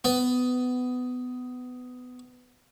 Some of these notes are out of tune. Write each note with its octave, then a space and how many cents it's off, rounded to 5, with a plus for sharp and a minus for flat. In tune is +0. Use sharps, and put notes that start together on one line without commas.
B3 +20